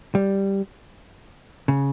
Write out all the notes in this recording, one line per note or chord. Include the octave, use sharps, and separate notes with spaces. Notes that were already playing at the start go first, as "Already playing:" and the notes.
G3
C#3